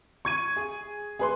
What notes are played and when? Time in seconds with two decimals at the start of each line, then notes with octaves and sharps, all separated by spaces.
0.25 C#6 G#6 D#7
0.56 G#4
1.19 G#4 B4 C6